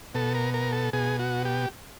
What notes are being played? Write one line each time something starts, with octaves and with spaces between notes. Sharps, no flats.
B2 A4
A#4
A#4
A4
B2 G#4
F#4
G4